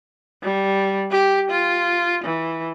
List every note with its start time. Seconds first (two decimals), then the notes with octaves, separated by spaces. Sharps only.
0.43 G3
1.11 G4
1.50 F4
2.24 E3